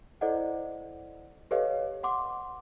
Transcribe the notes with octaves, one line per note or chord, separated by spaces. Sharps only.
E4 A4 C5 D5 D#5 F#5
G4 A4 B4 C#5 D#5 F5
F#5 C6 D6